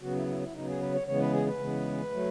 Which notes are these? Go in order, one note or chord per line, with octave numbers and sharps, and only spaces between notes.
C#3 F#3 B3 F#4
E4
E4
E4
C#3 F#3 B3 D#4
G#4
B4
C#5
C#3 E3 G#3 B3 C#5
B4
G#4
B4
C#3 E3 G#3 B3
F#3 A3